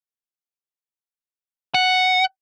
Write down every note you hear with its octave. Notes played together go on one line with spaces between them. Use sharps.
F#5